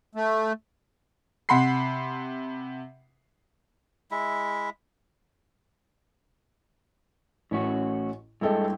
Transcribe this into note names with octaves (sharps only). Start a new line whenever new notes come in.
A3
C3 F#5 B5 C6 C7
G#3 E4 E5
A1 A2 C#4 F#4
G2 G#3 E4 A4 D#5 G5